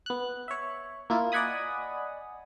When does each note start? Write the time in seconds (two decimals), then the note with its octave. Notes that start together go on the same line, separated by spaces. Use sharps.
0.06 B3 F#6
0.48 C#5 E5
1.10 A#3 E4 F4
1.32 D5 D#5 F#5 G#5 B5 D#6